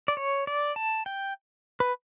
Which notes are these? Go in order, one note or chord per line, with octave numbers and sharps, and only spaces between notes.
D5
C#5
D5
A5
G5
B4